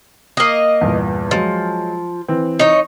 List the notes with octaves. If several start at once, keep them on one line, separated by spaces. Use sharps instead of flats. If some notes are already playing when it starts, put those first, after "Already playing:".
A#3 D#5
E2 G2 A#2
F3 F#3 G#3
E3 C4
D#4 C#5